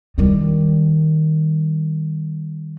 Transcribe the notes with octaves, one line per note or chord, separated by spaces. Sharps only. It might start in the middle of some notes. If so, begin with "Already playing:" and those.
D#3 G3